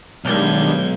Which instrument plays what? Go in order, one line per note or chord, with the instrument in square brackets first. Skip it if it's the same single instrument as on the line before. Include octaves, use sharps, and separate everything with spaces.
[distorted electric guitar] B1 [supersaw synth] D#3 G3 D4 [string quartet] G#3 G6 G#6